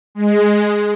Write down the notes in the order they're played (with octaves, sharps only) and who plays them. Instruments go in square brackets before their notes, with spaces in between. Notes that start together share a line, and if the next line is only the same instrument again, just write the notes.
[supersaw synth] G#3